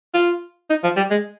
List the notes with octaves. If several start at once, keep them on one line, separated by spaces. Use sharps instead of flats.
F4
D#4
F3
G3
G#3